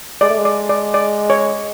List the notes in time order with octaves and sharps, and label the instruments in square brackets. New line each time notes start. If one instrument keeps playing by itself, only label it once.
[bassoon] G#3 [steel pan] D5
[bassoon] A3
G#3
[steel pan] D5
D5
D5
C#5